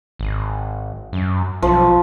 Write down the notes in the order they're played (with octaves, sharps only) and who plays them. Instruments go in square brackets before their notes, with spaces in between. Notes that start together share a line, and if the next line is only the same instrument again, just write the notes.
[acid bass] G#1
F#2
[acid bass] B1 [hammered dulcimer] F3